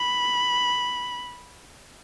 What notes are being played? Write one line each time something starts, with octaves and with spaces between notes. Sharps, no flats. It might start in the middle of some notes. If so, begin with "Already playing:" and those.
Already playing: B5